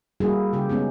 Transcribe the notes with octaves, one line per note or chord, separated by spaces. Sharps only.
G3 A#3 E4 F#4 G#4
C#3 G4
G#3 B3 C#4 D#4